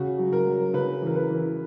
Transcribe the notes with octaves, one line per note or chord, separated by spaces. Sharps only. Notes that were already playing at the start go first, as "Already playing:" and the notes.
Already playing: C#3 F#4
F#3
A#4
F#3
C#3 B4
E3 A#4
B4
E3